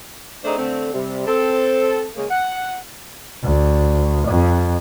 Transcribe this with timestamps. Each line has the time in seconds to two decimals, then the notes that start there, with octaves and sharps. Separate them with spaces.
0.45 A3 C4 D4 D#4 G#4 C5
0.59 D3 A3 C4
0.93 C3 G3
1.27 C4 A4
2.16 C#3 G#3 A#3
2.30 F#5
3.44 D2
4.29 F2